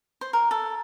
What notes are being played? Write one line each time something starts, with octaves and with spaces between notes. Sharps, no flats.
C5
A#4
A4